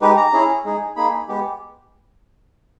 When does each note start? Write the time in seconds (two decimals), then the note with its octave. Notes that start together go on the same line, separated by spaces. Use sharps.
0.01 G#3 D#4 G4 B4
0.17 A#5
0.33 C#4 E4 G#4
0.65 G#3 D#4 G#4
0.96 A#3 D#4 G#4 B5
1.29 G#3 B3 G4